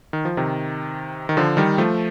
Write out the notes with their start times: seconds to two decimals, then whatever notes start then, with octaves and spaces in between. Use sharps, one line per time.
0.13 D#3
0.25 F3
0.37 C3 D#3
1.29 D#3
1.37 D3 F3
1.57 D#3 G3
1.78 F3 A3